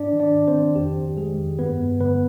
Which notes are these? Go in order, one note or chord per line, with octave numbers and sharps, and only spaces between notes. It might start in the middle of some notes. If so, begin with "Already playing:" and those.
Already playing: G#2 D4 D5
D#3
D4 D5
G#2
C4 C5
D#3
F2 G4
F2
D#3 G#3 G#4
F2
G2 B3 B4
G2
D3 B3 B4